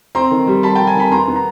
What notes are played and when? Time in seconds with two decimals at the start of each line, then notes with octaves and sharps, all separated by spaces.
0.15 C4 A#5 C6
0.31 D#3
0.47 G3
0.63 G3 A5 B5
0.75 G5 A5
0.79 G3
0.87 G#5 A#5
0.95 D#3 A5 B5
1.12 B3 A#5 C6
1.28 B3
1.36 A#5